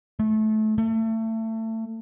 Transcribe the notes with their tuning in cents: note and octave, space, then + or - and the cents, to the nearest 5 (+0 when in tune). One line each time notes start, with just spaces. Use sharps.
A3 -25
A3 +25